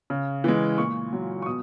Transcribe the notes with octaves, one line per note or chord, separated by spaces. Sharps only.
C#3
E3 G#3
A#2 C#6
F#3
C#6
B2 D#6